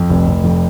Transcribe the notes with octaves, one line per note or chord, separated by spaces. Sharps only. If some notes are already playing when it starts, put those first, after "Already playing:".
Already playing: F2
F1
F1
F2